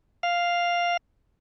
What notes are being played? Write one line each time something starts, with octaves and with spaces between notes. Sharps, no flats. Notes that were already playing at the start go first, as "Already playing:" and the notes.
F5